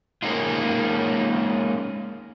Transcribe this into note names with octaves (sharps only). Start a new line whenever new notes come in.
G#3 A#3 C#4 D#4 F4